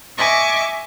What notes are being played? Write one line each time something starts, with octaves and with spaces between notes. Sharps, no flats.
D#5 E5 G#5 C#6 D6